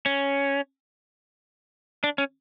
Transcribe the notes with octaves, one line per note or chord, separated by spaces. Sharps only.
C#4
D4
C#4